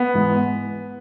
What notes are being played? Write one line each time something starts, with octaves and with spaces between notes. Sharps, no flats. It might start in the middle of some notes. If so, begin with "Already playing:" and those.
Already playing: B3
G#2 E3 G#3